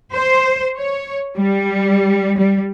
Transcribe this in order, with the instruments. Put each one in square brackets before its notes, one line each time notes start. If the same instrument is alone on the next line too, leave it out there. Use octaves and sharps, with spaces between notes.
[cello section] C5
C#5
G3
G3